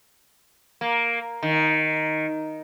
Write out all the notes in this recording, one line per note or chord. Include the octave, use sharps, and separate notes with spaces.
A#3
D#3